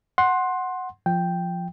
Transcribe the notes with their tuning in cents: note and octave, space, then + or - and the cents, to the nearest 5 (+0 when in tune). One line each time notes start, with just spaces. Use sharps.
F#5 +0 C6 +15
F3 +0 G5 +0